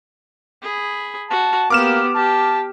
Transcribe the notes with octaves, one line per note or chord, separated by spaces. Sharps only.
G#4 B5
F#4 A5
A#3 B3 G4 D6 F6 E7
G4 A5